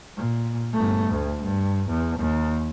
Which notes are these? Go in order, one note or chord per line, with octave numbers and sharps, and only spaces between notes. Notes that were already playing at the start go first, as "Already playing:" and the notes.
A#2
G1 A3
D2
G2
E2
D#2